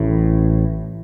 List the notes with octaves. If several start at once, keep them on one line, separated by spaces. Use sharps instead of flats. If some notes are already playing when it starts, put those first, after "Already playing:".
Already playing: A1 A2